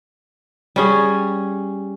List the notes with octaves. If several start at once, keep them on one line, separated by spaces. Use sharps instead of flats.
G3 C#4 G#4